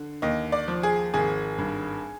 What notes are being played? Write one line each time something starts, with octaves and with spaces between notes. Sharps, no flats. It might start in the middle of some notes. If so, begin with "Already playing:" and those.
Already playing: D3
D#2 D#5
D5
F3
G#4
G#1 G#4
G2